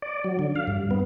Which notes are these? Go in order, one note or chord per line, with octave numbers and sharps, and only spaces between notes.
D5
F#3
D3
F5
G2
B3